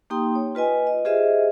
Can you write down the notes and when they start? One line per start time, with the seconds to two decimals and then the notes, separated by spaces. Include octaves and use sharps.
0.10 A#3 D#4 G4 G5 C6 D#6
0.35 C#5
0.55 F4 B4 D#5 G#5
0.87 D#5
1.05 F4 G4 G#4 C5 D#5 E5